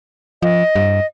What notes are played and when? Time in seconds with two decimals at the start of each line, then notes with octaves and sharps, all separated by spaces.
0.42 F3 D#5
0.76 G2